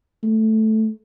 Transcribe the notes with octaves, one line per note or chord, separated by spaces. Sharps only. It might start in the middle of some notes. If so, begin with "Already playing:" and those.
A3